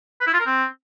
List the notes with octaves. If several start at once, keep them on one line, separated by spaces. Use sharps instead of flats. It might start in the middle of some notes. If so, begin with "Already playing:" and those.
B4
E4
F4
A#4
C4